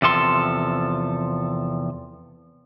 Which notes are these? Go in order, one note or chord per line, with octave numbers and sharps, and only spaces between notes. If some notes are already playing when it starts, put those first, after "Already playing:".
E2 C3 F3 A4 C6